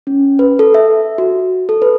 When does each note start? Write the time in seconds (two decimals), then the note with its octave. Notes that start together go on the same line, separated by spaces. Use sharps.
0.07 C#4
0.39 B4
0.59 A4
0.74 E5
1.18 F#4
1.69 A4
1.82 B4